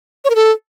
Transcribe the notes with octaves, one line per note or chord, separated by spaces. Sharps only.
C#5
A#4
A4